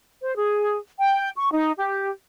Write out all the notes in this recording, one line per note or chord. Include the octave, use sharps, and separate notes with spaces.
C5
G#4
G5
C#6
D#4
G4